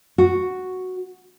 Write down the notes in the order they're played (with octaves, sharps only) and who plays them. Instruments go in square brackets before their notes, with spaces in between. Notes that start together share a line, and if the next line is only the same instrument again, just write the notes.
[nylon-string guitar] F#4